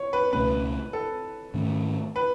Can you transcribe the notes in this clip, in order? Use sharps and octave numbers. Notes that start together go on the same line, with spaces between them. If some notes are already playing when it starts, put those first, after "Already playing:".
Already playing: C#5
B4
C#2 B2 A3 C#4 B4
A4
G#2 D#3 A3 C#4
B4